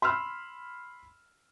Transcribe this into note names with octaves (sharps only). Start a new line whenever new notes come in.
B5 C6 E6 F6